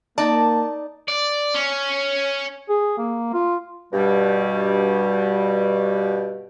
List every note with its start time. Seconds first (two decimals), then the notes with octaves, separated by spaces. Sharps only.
0.18 A#3 D#4 D5 A5
1.08 D5
1.54 C#4
2.69 G#4
2.98 A#3
3.34 F4
3.93 G2 B2 G3